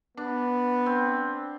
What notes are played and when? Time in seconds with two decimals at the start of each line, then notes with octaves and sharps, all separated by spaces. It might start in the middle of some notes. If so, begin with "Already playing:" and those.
0.17 B3 D4
0.86 C4